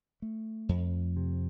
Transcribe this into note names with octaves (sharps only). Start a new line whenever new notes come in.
A3
F2
C3